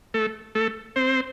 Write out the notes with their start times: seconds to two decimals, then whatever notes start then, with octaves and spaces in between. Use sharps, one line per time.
0.14 A3 A4
0.55 A3 A4
0.96 C4 C5